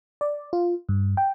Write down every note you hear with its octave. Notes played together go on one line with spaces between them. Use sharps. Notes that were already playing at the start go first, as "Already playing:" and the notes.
D5
F4
G2
G5